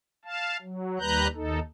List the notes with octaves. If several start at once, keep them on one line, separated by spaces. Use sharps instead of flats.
F5 A5
F#3
D#2 G3 B4 A#5 F#6 G6
D#2 D#4 A4